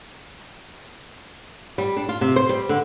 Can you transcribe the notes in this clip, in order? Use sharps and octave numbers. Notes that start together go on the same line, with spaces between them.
G3
D4
F4
C3
C5
G3
D3